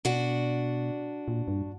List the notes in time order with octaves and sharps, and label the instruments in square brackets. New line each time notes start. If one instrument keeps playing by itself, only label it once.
[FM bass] B2 [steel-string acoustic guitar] D4 F#4
[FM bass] A#2
G2